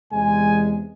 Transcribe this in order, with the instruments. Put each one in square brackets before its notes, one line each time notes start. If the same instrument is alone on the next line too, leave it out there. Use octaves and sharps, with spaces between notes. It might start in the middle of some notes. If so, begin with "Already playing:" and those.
[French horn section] E2 C3 G#3 [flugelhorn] G#5